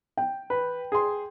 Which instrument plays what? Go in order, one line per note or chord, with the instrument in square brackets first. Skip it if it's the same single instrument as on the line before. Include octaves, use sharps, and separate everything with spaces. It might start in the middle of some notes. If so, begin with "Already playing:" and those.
[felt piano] G5
[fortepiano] B4
G#4 C6